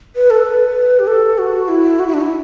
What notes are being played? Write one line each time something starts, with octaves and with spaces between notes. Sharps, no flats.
B4
A4
B4
G4
A4
F#4
E4
F#4
E4
D4
E4